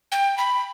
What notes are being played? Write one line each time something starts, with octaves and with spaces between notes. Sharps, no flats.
G5
B5